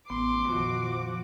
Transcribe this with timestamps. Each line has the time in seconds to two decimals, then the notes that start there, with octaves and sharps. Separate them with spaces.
0.10 A1 B3 C6 D6
0.49 F2 A#2 D#3 F3 F#4